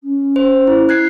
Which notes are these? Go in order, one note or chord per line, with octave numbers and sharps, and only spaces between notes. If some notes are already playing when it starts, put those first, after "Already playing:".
C#4
C5
E4
F#6 G#6 C7